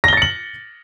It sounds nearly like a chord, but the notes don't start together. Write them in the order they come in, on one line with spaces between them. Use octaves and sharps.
A#6 G7 A6 C#7 F#7